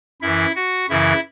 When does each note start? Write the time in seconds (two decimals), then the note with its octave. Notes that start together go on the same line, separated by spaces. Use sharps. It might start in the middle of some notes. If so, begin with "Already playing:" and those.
0.21 F#2 E3 E4 E5
0.55 F#4 F#5
0.90 F#2 C#3 E3 E4 E5